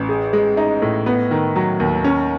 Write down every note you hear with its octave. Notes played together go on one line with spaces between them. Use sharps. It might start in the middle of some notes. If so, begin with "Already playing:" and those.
Already playing: A1
G#4
G#3
D#4
A2
B3
D#3
F#3
D#2
C#4